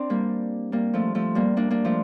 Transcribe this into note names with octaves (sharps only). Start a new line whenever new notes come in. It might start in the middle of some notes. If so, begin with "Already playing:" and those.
Already playing: C4 D4
G3 A#3
G3 A#3
F3 A3
F3 A3
G3 A#3
A#3 D4
A#3 D4
F3 A3